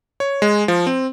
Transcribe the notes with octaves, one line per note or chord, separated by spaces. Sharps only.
C#5
G#3
F3
C4